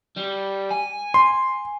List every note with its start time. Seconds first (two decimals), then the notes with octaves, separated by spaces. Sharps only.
0.16 G3
0.71 G#5
1.14 C6